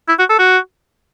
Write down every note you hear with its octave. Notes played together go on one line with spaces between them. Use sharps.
E4
F#4
A4
F#4